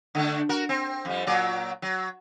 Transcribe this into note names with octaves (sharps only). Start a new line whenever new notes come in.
D3 A3 D4
F#4 A#4
C4
F2 G3
A#2 F#3 D5
F#3